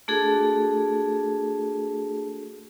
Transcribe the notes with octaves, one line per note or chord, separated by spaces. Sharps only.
A3 D4 F#4 G#4 A4